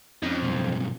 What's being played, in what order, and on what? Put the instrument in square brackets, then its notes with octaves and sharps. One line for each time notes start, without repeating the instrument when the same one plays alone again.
[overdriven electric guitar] F2 [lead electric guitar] C#4 D#4
[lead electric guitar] B1 G2